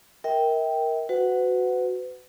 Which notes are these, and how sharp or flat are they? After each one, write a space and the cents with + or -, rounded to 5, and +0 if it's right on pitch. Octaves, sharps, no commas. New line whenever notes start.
A#4 +0 E5 -45 G5 +0
F#4 -5 B4 +35 F#5 +0